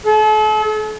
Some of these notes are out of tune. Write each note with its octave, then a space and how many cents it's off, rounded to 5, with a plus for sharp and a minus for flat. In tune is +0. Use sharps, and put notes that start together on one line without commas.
A4 -40